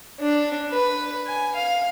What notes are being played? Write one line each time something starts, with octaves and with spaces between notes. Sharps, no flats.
D4
B4
G#5
F5